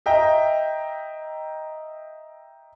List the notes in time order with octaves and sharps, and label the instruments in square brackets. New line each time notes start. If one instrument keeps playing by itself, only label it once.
[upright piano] D#5 E5 G5 A#5